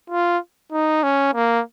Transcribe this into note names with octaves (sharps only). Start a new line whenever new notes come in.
F4
D#4
C#4
A#3